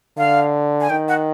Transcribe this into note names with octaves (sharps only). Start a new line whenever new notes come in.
D3 F5
G#5
D#3 G5
F#5